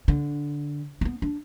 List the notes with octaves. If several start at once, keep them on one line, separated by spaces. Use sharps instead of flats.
D3
B3 C4
D4